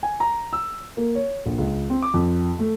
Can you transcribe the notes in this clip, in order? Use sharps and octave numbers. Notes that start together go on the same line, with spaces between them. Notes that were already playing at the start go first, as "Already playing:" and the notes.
G#5
A#5
E6
A#3
C#5
A#1
C#2
C4
D6
F2
A3